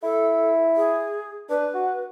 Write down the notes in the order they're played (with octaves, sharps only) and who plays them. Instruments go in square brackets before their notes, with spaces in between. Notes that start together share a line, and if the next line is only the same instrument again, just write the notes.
[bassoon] E4 [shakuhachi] A4
[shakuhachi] G#4
[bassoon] D4 [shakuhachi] B4
[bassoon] F#4